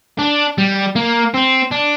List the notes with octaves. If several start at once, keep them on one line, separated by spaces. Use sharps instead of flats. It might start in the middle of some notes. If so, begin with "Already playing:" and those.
D4
G3
A#3
C4
D4